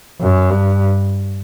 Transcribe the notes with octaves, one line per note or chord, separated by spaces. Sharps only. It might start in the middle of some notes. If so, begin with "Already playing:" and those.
F#2
G2